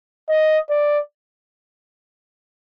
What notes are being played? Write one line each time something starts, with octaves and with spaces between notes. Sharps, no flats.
D#5
D5